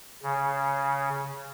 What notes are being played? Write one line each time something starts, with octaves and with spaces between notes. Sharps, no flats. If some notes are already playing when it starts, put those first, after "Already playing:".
C#3